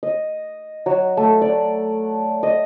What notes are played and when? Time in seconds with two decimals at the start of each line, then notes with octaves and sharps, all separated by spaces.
0.03 D#5
0.86 F#3
1.17 A3
1.42 D5
2.43 D#5